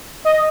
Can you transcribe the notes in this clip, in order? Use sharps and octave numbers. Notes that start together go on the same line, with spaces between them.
D#5